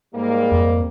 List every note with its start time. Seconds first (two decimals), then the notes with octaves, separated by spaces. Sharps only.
0.14 G#2 G3 A#3
0.52 F2